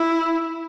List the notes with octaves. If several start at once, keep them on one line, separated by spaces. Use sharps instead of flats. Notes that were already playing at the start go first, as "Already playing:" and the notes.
Already playing: E4